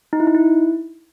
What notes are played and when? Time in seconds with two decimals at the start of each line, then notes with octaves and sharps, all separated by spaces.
0.13 D#4
0.20 E4
0.27 D#4
0.35 E4